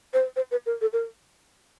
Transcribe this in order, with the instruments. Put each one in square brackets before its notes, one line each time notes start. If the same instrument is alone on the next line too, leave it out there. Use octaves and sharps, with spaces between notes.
[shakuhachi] C5
C5
B4
A#4
A4
A#4